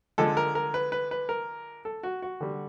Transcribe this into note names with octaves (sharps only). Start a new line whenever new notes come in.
D3 F3 G#3 A4
A#4
A#4
B4
B4
B4
A#4
A4
F#4
F#4
D3 G3